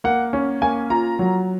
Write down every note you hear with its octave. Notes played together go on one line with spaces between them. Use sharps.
A#3 F#5
C#4
A#3 G#5
F4 A#5
F#3